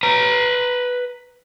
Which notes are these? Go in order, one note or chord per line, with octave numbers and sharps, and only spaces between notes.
B4 A#5